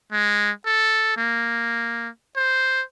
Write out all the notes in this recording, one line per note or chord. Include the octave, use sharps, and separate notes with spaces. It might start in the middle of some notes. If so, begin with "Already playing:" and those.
G#3
A4
A#3
C5